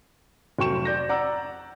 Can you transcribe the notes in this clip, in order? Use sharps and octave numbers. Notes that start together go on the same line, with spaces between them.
F1 F#3 G5 C#6 E7
D5 G6 A#6
D5 F#5 A#5 E6